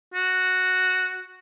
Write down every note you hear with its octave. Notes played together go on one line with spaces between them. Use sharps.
F#4